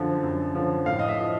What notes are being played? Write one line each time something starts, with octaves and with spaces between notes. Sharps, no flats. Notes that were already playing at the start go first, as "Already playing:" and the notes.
Already playing: F#2 D3 F3
F#2
D3 F3
A2 F5
D#5
E5
F3